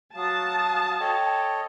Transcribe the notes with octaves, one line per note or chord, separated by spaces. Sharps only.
F#3 F#4 F5 A5 D#6
A4 C#5 D#5 G5